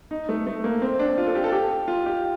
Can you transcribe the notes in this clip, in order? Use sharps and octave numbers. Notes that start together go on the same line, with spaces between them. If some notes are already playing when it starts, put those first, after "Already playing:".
D#4
A3
A3
A#3
C4
D4
F4
A4
G4
A4
G4
F4
G4